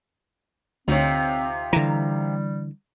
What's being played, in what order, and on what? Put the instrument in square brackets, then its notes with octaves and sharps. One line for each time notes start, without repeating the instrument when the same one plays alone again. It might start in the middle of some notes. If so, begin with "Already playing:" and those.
[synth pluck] D2 C#5 [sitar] C3 D#4 F4 [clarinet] C4
[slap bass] D3 E3 [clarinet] G3 [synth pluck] A#5